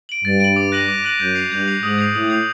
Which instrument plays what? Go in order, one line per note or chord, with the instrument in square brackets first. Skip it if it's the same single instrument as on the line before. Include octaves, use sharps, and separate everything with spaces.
[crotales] D7 F#7
[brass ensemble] G2 [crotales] A6
[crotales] D7 F#7
D6
F#6 A#6 D#7 F#7
D6
F#6 A#6 D#7 F#7
[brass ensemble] F#2 [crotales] G6
[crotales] C7 F7
[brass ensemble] G2 [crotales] G6
[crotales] C7 F7
[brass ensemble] G#2 [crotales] D#6
[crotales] G6 C7 F7
[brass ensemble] A2 [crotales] D#6
[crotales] G6 C7 F7